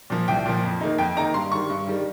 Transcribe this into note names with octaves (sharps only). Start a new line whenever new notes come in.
A#2 F3
C2 G5
A#2 F3
F2
D#3 A#3 D#4
F2 G5
D#3 A#3 D#4 A#5
G2 C6
D#3 G3 C#6
G2
D#3 G3